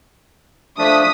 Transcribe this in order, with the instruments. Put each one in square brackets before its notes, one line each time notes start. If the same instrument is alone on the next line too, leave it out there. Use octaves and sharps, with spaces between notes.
[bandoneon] F3 A3 D4 [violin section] D#6 B6